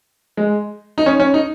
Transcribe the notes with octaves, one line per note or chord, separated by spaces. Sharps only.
G#3
D#4
C#4
C#4
D#4